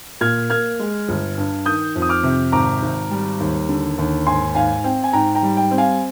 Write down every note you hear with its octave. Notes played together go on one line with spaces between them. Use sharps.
A#2 F6 G#6
A#3 F6 G#6
G#3
G1
G2
D#3 D#6 G6
F2
D#6
D6 F6
C3
G#1 A#5 D6
G#1
G3
D#2
D3
D#2
G#2 G#5 C6
G#2 F5 G#5
C4 G5
G#5
G#2 G5 A#5
G5 A#5
G3
G5
C4
F5 G#5